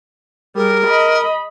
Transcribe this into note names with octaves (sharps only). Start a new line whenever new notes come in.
G3 G#4 A#4
D#5 B5